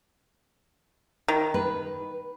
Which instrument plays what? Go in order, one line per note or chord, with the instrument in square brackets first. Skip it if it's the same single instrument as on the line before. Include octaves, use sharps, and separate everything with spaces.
[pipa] D#3
[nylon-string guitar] B4